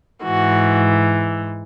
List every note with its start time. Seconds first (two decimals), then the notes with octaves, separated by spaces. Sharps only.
0.24 G#2 E3 F#4